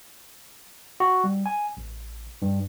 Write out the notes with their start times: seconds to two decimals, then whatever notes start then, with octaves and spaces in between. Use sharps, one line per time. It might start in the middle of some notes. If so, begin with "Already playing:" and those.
1.00 F#4
1.24 G3
1.46 G#5
1.77 A1
2.42 G2